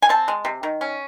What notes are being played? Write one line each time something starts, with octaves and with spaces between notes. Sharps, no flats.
G#5
C4 A5
G#3
C3
D#3
C#4